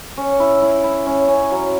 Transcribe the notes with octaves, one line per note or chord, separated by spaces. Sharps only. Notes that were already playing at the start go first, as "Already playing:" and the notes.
C#4
E4
E4
E4
C#4
C#4
F#3